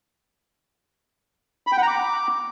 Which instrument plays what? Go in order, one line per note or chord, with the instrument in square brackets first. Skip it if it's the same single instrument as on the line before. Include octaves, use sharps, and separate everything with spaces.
[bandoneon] B5
G5
F#5
A#5
D6